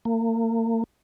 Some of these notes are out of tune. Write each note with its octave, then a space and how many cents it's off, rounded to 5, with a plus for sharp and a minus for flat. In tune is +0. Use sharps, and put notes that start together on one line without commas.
A#3 -40